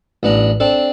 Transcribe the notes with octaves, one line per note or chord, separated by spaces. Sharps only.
A1 B3 D4 A#5
C4 D4 A4